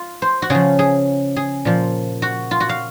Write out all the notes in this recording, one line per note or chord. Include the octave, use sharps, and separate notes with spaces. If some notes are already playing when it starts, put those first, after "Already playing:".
Already playing: F4
C5
F#4
C#3 F3 G#4
G#4
G#4
A#2 F3
F#4
F4
F#4
F5